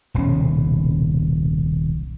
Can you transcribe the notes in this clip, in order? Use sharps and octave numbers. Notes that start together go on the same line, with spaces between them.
D#1 B1 C3 C#4